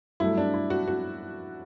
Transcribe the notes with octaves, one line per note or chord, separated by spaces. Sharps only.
G2 F#3 A3 E4
D4
E4
F#4
F#4